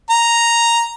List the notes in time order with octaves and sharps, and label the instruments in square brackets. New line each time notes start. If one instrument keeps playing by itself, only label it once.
[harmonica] A#5